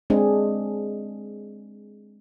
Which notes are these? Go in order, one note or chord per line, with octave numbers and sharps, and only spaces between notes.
G#3 C4 D4 G#4